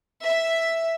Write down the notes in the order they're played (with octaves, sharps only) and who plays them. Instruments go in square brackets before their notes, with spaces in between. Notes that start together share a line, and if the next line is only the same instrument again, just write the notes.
[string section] E5